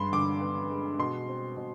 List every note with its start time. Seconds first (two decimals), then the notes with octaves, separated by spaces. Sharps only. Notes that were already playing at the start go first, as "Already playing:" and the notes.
Already playing: G2 G#3 B3 B5 C6
0.12 D3 D6
0.41 B3
0.70 G#3
0.99 B2 C6
1.28 C4
1.57 B2